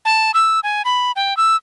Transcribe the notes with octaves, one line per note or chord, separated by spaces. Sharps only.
A5
E6
G#5
B5
G5
E6